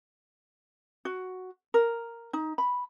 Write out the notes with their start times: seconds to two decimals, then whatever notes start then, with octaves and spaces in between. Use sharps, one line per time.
1.05 F#4
1.74 A#4
2.33 D#4
2.58 B5